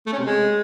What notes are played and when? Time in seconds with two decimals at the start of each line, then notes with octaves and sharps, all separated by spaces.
0.06 A3
0.13 C#4
0.19 C3
0.25 G#3